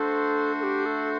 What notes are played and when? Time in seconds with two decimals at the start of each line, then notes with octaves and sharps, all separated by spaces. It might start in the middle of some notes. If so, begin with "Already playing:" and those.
Already playing: A3 D4 F#4 A4 C5
0.60 A4
0.63 G4
0.86 A4